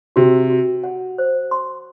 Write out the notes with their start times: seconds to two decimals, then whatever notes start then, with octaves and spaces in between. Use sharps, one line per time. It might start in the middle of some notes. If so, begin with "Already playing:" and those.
0.16 C3 F#4
0.50 F#4
0.84 F#5
1.18 C5
1.51 C6